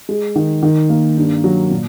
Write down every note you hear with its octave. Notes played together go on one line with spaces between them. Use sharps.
G#3
D#3
D#3
A#3
G2
F#3
A#2